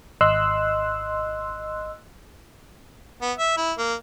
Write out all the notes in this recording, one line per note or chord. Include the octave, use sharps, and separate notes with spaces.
G#1 D#5 C6 E6 F#6
B3
E5
E4
A#3